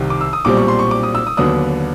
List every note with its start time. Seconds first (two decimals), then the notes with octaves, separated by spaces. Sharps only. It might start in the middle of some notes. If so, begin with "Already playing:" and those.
Already playing: C2 C3 D#3
0.10 D6
0.21 E6
0.33 D#6
0.45 B1 A#2 G3 C4 D6
0.57 C#6
0.68 C6
0.79 C#6
0.91 D6
1.03 D#6
1.15 E6
1.27 D#6
1.37 D#2 D3 F#3 B3 D4 D#6